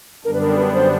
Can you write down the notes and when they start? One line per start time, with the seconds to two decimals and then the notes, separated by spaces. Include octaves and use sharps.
0.24 F#2 D3 G3 B3 D4 A#4
0.33 B4
0.41 A#4
0.57 B4
0.73 C5